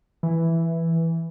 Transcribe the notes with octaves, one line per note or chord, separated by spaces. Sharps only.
E3